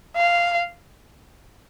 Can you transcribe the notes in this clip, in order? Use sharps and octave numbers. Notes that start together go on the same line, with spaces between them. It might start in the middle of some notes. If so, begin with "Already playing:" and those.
F5